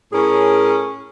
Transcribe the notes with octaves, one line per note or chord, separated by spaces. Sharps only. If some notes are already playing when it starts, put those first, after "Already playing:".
A2 C#4 G#4 A#4